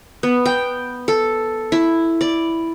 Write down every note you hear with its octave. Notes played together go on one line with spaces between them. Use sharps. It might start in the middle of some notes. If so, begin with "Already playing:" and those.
B3
G5
A4
E4
D5